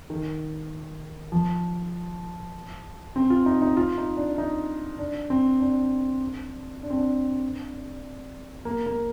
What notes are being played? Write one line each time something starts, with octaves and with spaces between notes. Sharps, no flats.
D#3
F3
C4
F4
D#4
D#4
F4
D#4
D4
D#4
D4
C4
D4
D4
C4
D4
A#3
A#3